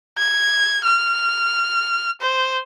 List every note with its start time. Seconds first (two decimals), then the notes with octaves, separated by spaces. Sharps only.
0.18 G#6
0.85 F6
2.21 C5